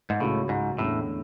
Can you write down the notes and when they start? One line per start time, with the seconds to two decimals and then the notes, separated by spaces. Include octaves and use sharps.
0.10 G#2
0.20 C#2 A2 C#3 F#3
0.49 G#2
0.78 E2 A2 D3 A3 C#4